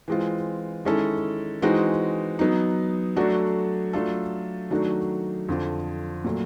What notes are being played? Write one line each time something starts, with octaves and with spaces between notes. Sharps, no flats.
E3 G#3 C4 F4
D#3 G#3 C#4 E4 A4
E3 G#3 C4 D#4 F#4
F#3 B3 D#4
F#3 A3 D4 F#4 A4
F#3 A3 D4 F4 A4
D#3 F#3 A3 D4 F#4
F2 D3 F3
A#2 F#3 A3